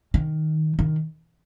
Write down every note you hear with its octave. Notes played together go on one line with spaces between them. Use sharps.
D#3
D#3